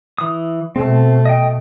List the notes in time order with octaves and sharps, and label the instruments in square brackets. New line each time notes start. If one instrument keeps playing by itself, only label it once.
[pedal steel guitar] E3 D#6
[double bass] B2 A3 [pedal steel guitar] C4
[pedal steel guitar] D#5 G5